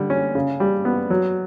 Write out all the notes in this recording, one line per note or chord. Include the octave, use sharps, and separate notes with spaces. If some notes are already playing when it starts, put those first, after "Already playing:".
Already playing: D3 G3
C#4
C#3
G3
B3
F#3